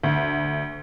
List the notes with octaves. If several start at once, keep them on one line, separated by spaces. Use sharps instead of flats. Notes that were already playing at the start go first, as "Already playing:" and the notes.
D2